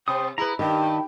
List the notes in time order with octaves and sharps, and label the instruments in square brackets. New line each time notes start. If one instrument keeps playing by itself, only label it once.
[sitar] C3 [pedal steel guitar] C5 D#6 [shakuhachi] G5
[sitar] E4 [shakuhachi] G#4 [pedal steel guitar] B4 A#5
[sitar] G2 [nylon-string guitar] D#3 [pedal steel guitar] G4 [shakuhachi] G5